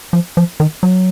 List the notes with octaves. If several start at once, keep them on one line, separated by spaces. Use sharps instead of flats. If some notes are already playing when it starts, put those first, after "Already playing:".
F3
F3
D#3
F#3